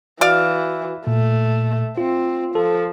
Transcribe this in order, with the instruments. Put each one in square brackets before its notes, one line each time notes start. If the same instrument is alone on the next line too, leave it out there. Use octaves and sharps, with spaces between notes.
[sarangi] E3 [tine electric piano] F#4 [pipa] D5 F5
[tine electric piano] A#2 [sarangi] A3
[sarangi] C4 [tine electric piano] F4
[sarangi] F3 [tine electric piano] A4